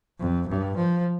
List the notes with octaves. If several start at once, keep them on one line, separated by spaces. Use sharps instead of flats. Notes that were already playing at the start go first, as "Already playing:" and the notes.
F2
G2
F3